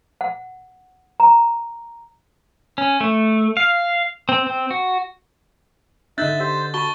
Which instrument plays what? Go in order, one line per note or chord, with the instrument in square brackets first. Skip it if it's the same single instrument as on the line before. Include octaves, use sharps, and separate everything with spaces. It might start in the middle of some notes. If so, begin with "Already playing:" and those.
[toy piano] F#5
A#5
[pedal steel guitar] C#4
A3
F5
C4
C4
F#4
[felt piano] D3 D#5 F#6 [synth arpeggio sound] D4 D#4 [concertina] E5 [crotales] G6 A6
[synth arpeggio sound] G4 B6 [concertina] C5
[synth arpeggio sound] F#4 B5 [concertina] A5 [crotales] C#6 G7